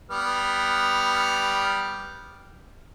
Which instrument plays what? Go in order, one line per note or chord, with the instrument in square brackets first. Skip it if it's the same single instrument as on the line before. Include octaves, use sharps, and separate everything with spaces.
[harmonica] G3 B3 F6